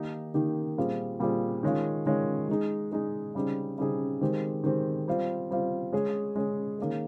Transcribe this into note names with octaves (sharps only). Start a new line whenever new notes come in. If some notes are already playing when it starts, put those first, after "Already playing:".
Already playing: D#3 A#3 D#4 G4
D#3 A#3 D#4 G4
A#2 G3 C4 F4 G#4
A#2 G3 C4 F4 G#4
D#3 G#3 C#4 F4
D#3 G#3 C#4 F4
G#3 D#4 G#4
G#3 D#4 G#4
C#3 G3 C4 D#4 G#4
C#3 G3 C4 D#4 G#4
D#3 G#3 C4 G4
D#3 G#3 C4 G4
G3 C4 F4
G3 C4 F4
G#3 C#4 G#4
G#3 C#4 G#4
D#3 A#3 C#4 G#4